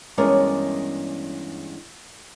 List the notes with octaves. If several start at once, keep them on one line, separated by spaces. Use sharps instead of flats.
E2 G2 G#3 C#4 A#4 D5